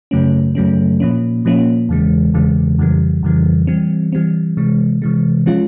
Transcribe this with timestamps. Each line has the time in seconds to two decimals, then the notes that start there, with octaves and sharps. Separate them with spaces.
0.11 F#2 C#3 F#3 A3 C#4
0.55 F#2 C#3 F#3 A3 C#4
1.00 A#2 F3 A#3 C#4
1.45 A#2 F3 A#3 C#4
1.89 E2 C#3 E3 G#3
2.34 E2 C#3 E3 G#3
2.79 F2 C#3 E3 G3
3.23 F2 C#3 E3 G3
3.67 E3 G3 C4
4.12 E3 G3 C4
4.57 C3 E3 G#3
5.02 C3 E3 G#3
5.46 F3 G#3 C#4 F4